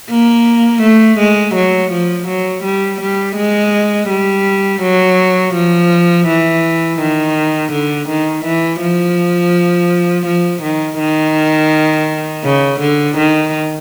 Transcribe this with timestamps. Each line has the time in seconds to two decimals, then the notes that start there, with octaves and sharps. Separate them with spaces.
0.10 A#3
0.82 A3
1.19 G#3
1.55 F#3
1.91 F3
2.28 F#3
2.64 G3
3.01 G3
3.37 G#3
4.10 G3
4.82 F#3
5.54 F3
6.27 E3
7.00 D#3
7.72 D3
8.09 D#3
8.45 E3
8.81 F3
10.26 F3
10.62 D#3
10.99 D#3
12.44 C#3
12.80 D3
13.17 D#3